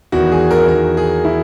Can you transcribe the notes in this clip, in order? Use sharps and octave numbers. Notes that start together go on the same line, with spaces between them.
E2 D#3 F#4
G#4
A#4
E2 D#3 A#4
G#4
E4